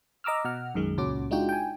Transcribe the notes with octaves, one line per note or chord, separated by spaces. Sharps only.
D#5 A#5 D6 E6 F6
B2 F#5 F6
B1 F#2 D#3 G#3
C#2 A#2 C#4 F#4 D6
G#3 D4 D#4 F4 F#4 G5
G5 G#5